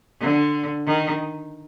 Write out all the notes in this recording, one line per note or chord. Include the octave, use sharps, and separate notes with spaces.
D3
D#3